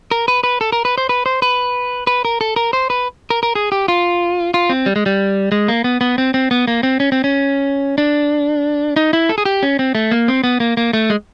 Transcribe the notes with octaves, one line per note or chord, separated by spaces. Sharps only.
A#4
B4
B4
A4
A#4
B4
C5
B4
C5
B4
B4
A#4
A4
A#4
C5
B4
A#4
A#4
G#4
G4
F4
F4
C4
G3
G#3
G3
G#3
A#3
B3
B3
C4
C4
B3
A#3
C4
C#4
C4
C#4
D4
D#4
E4
A4
G#4
G4
C#4
C4
A3
A#3
C4
B3
A#3
A#3
A3
G#3